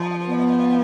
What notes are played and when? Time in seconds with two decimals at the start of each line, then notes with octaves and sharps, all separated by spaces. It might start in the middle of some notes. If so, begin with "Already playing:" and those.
Already playing: F3
0.26 B3